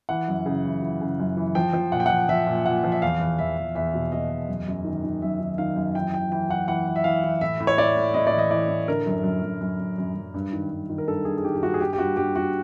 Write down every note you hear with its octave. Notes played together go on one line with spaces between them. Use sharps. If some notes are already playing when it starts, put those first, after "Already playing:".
E3 F#5
F#2
C#3
E3
E3
C#3
F#2
E3
F3 G5
F3
A#2 F#5
G5
F3 F#5
F3 E5
A#2
A#2 F#5
F3
E5
E2 F5
E2
E2 E5
E2
E2 E5
B2
B2 D#5
E2
F#2
F#2
D#3
D#3
F#2 E5
D#3
D#3 F5
F#2
E3 G5
E3 G5
E3 G5
E3 F#5
E3 F#5
E3
E5
E3 F5
E3
A2 E5
A2
C#5
A2 D5
A2
A2 D#5
D5
E3
D#5
E3 D5
A2
D3 A#4
F#2
F#2
F#2
F#2
F#2
F#2
F#2
G2
D#3
G2
D#3
A#4
G2 A4
G2 G#4
G#4
D#3 G4
G4
G2 F#4
G#4
G2 G4
G4
G2 F#4
G2 G4
G2 F#4